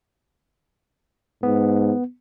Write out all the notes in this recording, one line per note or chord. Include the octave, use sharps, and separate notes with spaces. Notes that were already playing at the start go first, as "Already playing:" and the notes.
G#2 B3